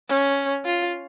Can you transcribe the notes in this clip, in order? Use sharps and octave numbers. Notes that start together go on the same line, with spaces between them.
C#4
F4